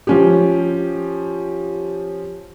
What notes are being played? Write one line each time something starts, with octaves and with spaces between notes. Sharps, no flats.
F3 C#4 G4